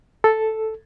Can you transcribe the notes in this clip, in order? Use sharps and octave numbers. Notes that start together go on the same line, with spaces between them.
A4